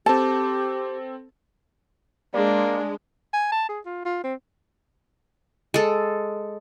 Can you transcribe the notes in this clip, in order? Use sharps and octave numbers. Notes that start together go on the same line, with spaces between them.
C4 G4 A4 A5
G#3 A#3 D4 D5
G#5
A5
G#4
F4
F4
C4
G#3 A4